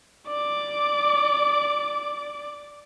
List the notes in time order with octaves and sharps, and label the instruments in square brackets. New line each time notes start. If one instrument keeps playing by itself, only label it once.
[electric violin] D5 D6